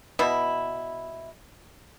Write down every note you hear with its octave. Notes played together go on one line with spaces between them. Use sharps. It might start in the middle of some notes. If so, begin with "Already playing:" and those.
B2 E4